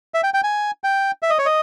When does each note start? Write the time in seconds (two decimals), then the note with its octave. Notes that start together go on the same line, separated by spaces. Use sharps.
0.14 E5
0.23 G5
0.34 G5
0.44 G#5
0.84 G5
1.23 E5
1.30 D#5
1.39 C#5
1.46 D#5